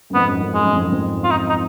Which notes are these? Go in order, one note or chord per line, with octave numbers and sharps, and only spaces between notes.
F#2
F2 G#2 B3
F#2
F#2
G#3
F#2
F2
F#2
F2 G#2
F4
D#4
D#4